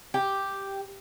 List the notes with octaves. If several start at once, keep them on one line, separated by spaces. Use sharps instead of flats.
G4